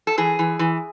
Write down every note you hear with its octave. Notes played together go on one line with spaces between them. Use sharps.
A4
E3 G#4
E3
E3